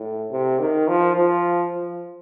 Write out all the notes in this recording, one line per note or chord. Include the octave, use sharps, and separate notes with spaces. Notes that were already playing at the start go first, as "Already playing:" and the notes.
Already playing: A2
C3
D#3
F3
F3
F3